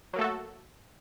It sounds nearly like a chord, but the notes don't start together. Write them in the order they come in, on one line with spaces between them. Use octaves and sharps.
F#3 A#3 A3 A4 F#4